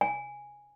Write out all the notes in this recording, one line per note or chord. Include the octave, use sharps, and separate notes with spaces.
G#5